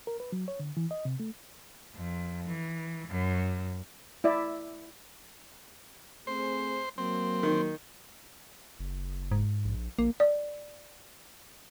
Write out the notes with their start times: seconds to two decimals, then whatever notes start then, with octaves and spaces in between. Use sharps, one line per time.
0.07 A#4
0.20 B4
0.32 F#3
0.48 C#5
0.60 D3
0.77 E3
0.91 D#5
1.05 C3
1.20 A3
1.94 F2
2.47 E3
3.08 F#2
4.24 E4 D5 E5
6.27 A3 C4 G#4 C5
6.98 F#3 A#3 C4
7.43 D#3
8.80 F#1
9.31 G#2
9.65 A#1
9.99 A#1 A#3
10.20 D5